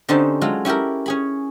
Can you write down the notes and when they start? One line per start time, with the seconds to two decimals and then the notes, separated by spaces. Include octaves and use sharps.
0.09 D3 C4 C#4 D#4 G4 A5
0.41 F#3 G#3 F4 A4
0.65 C#4 E4 G4 A4 A#4
1.06 C#4 G#4 B5